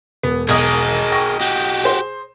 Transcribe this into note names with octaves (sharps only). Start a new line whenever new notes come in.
E1 B3
B1 G#4 A#4 D#5
G5 C#6 A#6
F#4 G4
G#4 C5